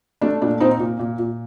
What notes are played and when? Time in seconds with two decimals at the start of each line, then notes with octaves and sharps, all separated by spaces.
0.22 A3 D4
0.42 A#2 D4
0.60 A#2 C4 D#4
0.80 A#2
0.99 A#2
1.19 A#2